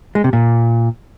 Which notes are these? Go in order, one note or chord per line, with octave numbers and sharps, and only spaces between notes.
G#3
C3
A#2